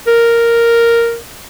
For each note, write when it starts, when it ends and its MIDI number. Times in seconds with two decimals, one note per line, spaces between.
0.07 1.18 70